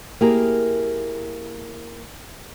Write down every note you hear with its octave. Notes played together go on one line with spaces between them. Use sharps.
A#3 E4 G4 G#4 A#4